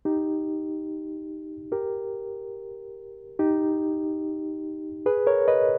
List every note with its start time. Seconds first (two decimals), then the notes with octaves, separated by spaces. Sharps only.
0.05 D#4 G4
1.72 G4 A#4
3.39 D#4 G4
5.06 G#4 B4
5.27 A#4 C#5
5.48 B4 D#5